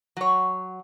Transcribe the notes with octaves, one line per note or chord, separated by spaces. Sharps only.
F#3 C#5